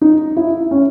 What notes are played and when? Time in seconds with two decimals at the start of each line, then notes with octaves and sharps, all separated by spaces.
0.01 D#4
0.37 E4
0.71 C#4